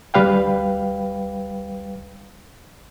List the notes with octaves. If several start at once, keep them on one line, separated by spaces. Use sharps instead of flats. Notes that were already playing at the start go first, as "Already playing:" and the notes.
D2 G3 B4 F5 G5